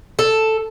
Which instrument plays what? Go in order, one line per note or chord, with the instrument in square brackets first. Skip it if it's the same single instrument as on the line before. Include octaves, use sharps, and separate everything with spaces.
[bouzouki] A4